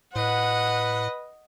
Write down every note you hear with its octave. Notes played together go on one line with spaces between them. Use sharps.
A2 B4 D#5 F#5